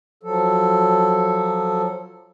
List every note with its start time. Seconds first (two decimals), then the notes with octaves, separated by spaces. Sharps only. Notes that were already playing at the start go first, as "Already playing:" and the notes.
0.23 F3 F#3 A4